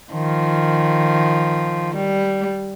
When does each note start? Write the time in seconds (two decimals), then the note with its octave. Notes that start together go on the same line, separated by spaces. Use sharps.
0.13 D#3 F3
1.95 G3